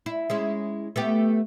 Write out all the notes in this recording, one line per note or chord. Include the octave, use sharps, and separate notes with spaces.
E4
G#3 C#4 E4
A3 B3 G4